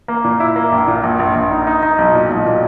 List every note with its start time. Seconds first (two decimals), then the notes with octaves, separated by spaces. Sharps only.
0.08 A#3
0.24 A#2
0.40 E4
0.56 A#3
0.72 A#1
0.88 A#2
1.03 A#1
1.19 A#1
1.35 A#1
1.51 D#4
1.67 D#4
1.83 D#4
1.98 B1
2.14 A#2
2.30 B1
2.46 A#2